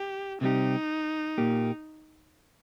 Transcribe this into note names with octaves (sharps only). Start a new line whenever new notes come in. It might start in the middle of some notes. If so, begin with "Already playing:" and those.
Already playing: G4
C3 G3 C4 D#4 G4
A#2 A#3 G4